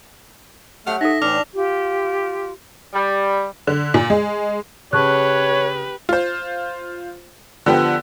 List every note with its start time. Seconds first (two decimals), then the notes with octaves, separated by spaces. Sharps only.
0.87 F#3 A3 G4 F#5 F6
1.01 D#4 A4 E5 A#6
1.22 A2 E3 D4 D6 F6 F7
1.54 F4 G4
2.94 G3
3.67 D3
3.94 A#2
4.10 G#3
4.93 C#3 G4 B4 C#5 A5 C#6 F#6
6.09 F4 C5
7.66 D3 F3 B3 G4